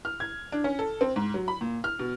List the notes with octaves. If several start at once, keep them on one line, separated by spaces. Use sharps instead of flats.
F6
G#6
D4
C#4
A4
C4
G#2
F#3
B5
A#2
F6
B2